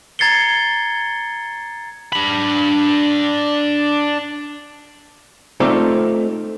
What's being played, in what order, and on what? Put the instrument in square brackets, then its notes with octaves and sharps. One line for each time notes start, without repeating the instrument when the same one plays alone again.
[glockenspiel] A#5 G#6 A6 C7 C#7 G7
[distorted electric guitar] D4 B5
[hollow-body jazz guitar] A3 C4 D#4 F4 A4 D5